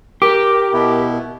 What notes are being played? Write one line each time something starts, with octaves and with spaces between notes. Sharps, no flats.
G4 A#4 D6
B2 B3 E4